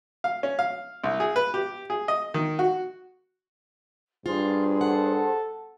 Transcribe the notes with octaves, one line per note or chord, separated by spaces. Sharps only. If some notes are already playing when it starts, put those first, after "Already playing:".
F5
C#4
F5
C2
G#4
B4
G4
G#4
D#5
D#3
F#4
G2 F4 G#4 C5
A4 F#5